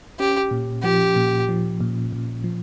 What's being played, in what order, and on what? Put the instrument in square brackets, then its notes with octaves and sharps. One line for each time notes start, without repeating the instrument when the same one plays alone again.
[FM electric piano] C#4 [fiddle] G4
[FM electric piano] A#2
[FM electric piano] F3 [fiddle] G4
[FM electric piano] A#2
F3
A#2
A#2
F3